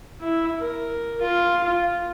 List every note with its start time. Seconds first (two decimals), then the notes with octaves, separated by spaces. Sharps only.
0.20 E4
0.59 A#4
1.22 F4
1.64 F4